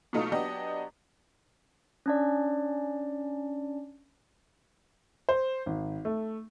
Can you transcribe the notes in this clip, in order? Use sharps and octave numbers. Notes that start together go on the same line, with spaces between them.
B2 F#3 A3 D#4 F4
F#3 B3 D4 G4 D#5
C#4 D4 D5
C5
G#1
A3